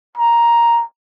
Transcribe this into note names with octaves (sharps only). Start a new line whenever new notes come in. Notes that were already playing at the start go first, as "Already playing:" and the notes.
A#5